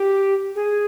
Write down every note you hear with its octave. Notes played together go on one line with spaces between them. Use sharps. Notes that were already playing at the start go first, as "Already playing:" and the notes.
Already playing: G4
G#4